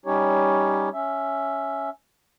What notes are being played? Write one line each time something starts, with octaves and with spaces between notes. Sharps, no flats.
G3 C#4 D#4 G4 C#5
C#4 E5